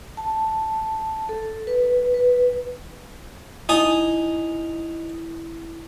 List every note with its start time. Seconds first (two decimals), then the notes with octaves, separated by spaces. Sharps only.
0.17 A5
1.29 A4
1.67 B4
2.14 B4
3.69 D#4 E4 G#5 D#6